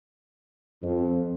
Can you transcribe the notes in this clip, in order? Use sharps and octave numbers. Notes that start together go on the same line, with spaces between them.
F2